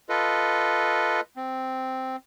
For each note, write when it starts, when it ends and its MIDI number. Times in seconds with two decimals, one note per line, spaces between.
0.09 1.21 65
0.09 1.21 69
0.09 1.21 71
0.09 1.21 75
1.37 2.16 60